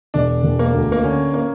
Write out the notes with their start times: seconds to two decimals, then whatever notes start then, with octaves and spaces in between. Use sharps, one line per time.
0.14 E1 D4
0.43 E1
0.59 A#3
0.74 D2
0.92 A#3
1.04 D3 C#4
1.34 A#3